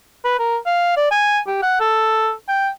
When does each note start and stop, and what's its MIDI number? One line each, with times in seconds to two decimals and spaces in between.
0.25 0.39 71
0.39 0.57 70
0.66 0.94 77
0.97 1.07 74
1.11 1.39 80
1.47 1.62 67
1.63 1.80 78
1.80 2.32 69
2.49 2.69 79